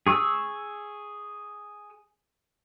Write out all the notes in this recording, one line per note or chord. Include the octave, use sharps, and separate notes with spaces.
G#4 C#6 D#6 E6